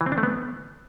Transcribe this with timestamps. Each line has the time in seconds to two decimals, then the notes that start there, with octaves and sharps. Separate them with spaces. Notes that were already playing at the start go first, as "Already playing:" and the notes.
0.01 E3
0.06 C4
0.12 D4
0.18 A3
0.23 B3